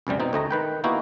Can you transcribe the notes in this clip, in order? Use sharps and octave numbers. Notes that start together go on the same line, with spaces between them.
C#2 F#2 C3 G3
B2 C4 D#4
D2 A3 D#5 A#5
D#3 B4 G5
A#3 B3 D#4 E4 F#4 G4